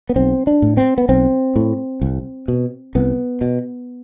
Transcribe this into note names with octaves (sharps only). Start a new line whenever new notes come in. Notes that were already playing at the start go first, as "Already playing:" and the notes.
B3
B1 C4
D4
A2
C4
B3
B1 C4
A2
C2
B2
C2 B3
B2